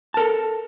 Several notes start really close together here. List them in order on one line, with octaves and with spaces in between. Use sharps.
A5 A#4 A4